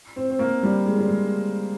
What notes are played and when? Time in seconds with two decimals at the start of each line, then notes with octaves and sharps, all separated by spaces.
0.16 C4
0.30 C4
0.39 A#3
0.63 G3
0.86 G#3
0.98 G3
1.09 G#3